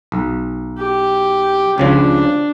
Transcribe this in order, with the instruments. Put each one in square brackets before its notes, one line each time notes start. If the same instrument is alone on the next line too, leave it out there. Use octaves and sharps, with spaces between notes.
[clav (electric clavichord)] B1
[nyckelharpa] G4
[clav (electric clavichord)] C#2 C#3 F3 [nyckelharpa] D4